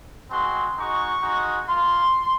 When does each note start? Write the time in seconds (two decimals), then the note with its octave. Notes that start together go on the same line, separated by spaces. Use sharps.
0.30 G#3 C4 F#4 C6
0.76 G#3 D#4 F#4 C#6
1.23 G#3 D#4 F#4
1.69 A#3 F4 C6